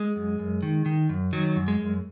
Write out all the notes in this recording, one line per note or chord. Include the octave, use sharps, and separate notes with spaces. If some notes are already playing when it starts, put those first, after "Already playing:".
Already playing: G#3
F#2
F#2
D#3
D#3
F#2
D#3 F#3
F#2
G#3
F#2